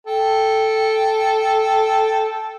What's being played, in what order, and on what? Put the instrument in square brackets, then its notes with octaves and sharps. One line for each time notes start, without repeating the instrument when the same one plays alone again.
[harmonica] A4 G5